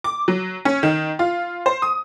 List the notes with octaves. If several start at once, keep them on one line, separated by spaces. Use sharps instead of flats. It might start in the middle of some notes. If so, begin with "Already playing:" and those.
D6
F#3
C#4
D#3
F4
C5
D#6